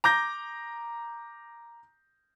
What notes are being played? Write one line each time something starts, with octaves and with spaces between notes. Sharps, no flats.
A#5 D6 G6 A#6